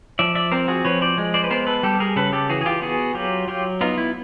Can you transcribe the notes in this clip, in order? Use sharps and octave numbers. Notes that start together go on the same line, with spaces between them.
F3 D5 E5
D5 E5
C4 A#4 C5
F#4 G#4
F3 B4 C#5
C5 D5
G#3
C5 D5
B4
B3 A#4 C5
A4 B4
G3 G4 A4
G#4 A#4
C#3 A4 B4
G4 A4
E3 F#4 G#4
G#4
F4 G4
B3 F#4 G#4
F#3 F4 G4
F#3 F4 G4
B3 D#4 F4
E4